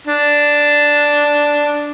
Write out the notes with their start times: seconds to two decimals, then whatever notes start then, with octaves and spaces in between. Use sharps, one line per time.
0.07 D4